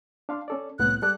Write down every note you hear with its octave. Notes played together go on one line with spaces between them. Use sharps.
D4 F5 C6
C#4 A4 D5
C2 A2 B3 F#6
G3 A4 D5 F#6